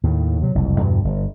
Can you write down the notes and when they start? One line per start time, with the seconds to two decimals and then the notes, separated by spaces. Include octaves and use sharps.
0.04 D#2 A2 D#3
0.42 C3 F#3
0.55 F#1 C2 F2
0.80 E2 G2 B2 D3
1.05 G1